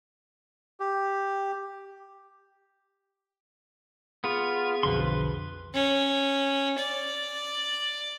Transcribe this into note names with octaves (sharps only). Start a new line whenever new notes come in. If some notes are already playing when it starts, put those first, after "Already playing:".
G4
B3 F4 G#4
B1 F2 D3 B4 C6
C#4
D5